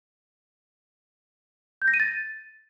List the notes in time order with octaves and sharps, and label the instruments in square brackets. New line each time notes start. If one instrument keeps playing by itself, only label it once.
[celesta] G6
A#6
D#7
A6